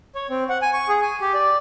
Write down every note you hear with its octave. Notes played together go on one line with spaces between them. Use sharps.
C#5
C4
F#5
G#5
C#6
G#4
G#5
G4
D5